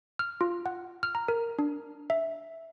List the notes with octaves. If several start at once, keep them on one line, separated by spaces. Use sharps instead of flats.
F6
F4
F#5
F6
A#5
A#4
D4
E5